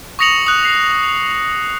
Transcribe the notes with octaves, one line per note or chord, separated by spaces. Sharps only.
C#6 D#6 A#6 C#7 F7 F#7
D#6 F#6
C7